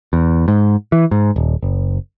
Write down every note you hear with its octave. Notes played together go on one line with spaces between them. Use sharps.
E2
G#2
E3
G#2
D#1
F#1